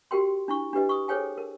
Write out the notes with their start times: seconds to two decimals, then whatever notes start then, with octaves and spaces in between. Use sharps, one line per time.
0.11 F#4 G4 A#4 G5 C6
0.48 D4 E4 C#6
0.73 D4 G4 B4 D#5
0.89 C#6 D#6
1.08 G#4 A4 C5 C#5 G5 G#5
1.38 A#4